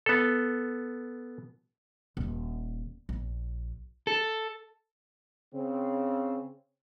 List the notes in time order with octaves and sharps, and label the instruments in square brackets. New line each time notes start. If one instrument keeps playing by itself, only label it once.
[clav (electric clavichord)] B3 A4
[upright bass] D#1
A#1
[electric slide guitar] A4
[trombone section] C#3 C4